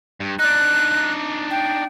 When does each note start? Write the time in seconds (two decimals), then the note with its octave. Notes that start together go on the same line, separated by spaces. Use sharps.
0.20 G2
0.39 D4 D#4 F#6
1.51 G5